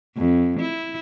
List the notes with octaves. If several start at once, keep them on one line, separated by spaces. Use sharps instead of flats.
F2
E4